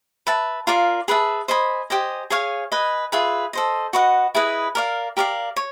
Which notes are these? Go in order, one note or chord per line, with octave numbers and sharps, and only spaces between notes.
B4 E5 A5
F4 A#4 D5 F5
G#4 B4 E5 A5
C5 D#5 G#5 B5
G4 C5 D#5 G#5
G#4 C#5 F5 G#5
B4 D#5 G#5
F4 G#4 B4 E5
A4 C5 D#5
F#4 B4 D#5 F#5
E4 G#4 B4 D#5
A#4 D5 F5
G4 A#4 D5 F5
C#5